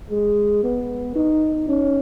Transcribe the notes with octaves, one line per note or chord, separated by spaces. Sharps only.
G#3
B3
D#4
C#4